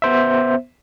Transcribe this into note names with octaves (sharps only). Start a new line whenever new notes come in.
B3 C5 E5